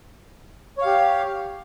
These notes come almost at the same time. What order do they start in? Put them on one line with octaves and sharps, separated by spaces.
C#5 F5 G4